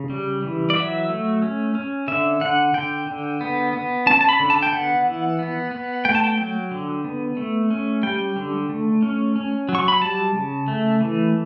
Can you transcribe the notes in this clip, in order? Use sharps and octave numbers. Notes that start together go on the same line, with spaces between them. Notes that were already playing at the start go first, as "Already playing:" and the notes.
Already playing: C#3
G3
E3
D5
F#3 E5
A3
C#4
C#4
D3 E5
D3 F#5
D3 G5
D3
B3
B3
C#4 A5
A5
B5
D3
A5
G5
B3 F#5
E3
B3
B3
A3 G5
A5
G5
F#3 G5
D3
B3
A3
C#4
G3 G5
D3
A3
C#4
C#4
F#3
C#6
B5
G3 A5
C#3
A3
E3